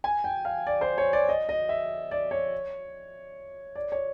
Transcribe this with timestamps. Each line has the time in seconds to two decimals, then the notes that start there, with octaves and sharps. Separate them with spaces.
0.04 G#5
0.24 G5
0.45 F5
0.67 D5
0.81 C5
0.98 C#5
1.13 D5
1.29 D#5
1.49 D#5
1.69 E5
2.11 D5
2.31 C#5
3.76 D5
3.92 C#5